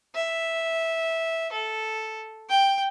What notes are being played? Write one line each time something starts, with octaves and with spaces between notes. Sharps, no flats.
E5
A4
G5